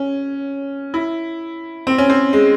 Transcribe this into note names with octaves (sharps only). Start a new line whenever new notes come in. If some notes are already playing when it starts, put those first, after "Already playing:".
Already playing: C#4
E4
C4
C#4
C4
G#3